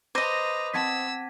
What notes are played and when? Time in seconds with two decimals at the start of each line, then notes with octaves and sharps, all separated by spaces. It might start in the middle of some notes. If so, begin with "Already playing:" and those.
0.15 B4 C5 D#5 A#5 D6 A#6 D#7
0.74 C4 F#5 A5 E6 G#6 B6